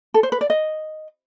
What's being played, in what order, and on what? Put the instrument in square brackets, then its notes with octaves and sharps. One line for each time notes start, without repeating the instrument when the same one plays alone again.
[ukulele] A4
C5
B4
D5
D#5